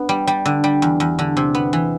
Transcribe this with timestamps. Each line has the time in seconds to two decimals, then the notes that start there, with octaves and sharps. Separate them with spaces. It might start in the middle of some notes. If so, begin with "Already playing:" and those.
Already playing: B3 D4
0.09 G3
0.27 G3
0.45 D3
0.64 G3
0.82 E2
1.00 E2
1.19 D3
1.37 C3
1.55 B3
1.73 E3